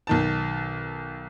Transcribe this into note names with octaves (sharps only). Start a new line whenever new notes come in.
B1 D#3 A5